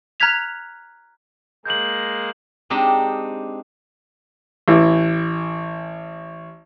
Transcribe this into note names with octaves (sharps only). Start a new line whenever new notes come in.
A#5 F6 F#6 G#6 B6 F7
G#3 A#3 G6 F#7
G#3 C4 D4 D#4 G4
A1 E3